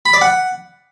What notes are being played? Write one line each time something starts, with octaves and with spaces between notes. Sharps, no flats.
B5
D5
F#5